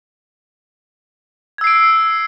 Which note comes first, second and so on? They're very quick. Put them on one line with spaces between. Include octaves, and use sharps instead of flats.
G#6 E6 C7 D7